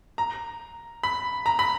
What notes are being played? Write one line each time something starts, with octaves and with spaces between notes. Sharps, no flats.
A#5
B5
A#5
B5